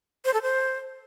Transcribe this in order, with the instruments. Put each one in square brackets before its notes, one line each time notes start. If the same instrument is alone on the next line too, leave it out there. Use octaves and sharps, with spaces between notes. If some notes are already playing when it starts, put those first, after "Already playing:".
[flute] C5
A4
C5